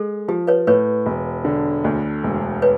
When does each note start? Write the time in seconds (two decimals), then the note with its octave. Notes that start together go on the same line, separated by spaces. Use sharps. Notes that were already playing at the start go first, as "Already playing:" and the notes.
Already playing: G#3 A4
0.28 F3 G4
0.47 B4 C#5
0.67 A2 B4 C#5
1.06 E1
1.45 D3
1.84 D2
2.24 E1
2.62 B4 C#5